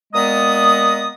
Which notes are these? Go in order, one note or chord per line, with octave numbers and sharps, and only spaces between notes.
A#2 G#3 B3 A#5 D#6